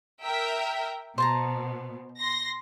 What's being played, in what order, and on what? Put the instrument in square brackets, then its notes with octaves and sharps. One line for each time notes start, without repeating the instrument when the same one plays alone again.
[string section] A#4 E5 G5
[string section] B2 [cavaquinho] C5 A5 A#5
[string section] C6 A#6